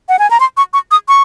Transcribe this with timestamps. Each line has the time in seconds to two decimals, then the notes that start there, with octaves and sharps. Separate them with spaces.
0.09 F#5
0.19 G#5
0.30 A#5
0.40 C6
0.57 C#6
0.73 C#6
0.91 D#6
1.08 C#6